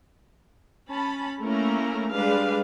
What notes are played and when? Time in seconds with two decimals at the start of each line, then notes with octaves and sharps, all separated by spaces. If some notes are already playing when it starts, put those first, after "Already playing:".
0.89 C#4 A5 B5
1.42 A3 A#3 C#4 E4 A#4
2.12 G3 G#3 D4 G4 B4 F5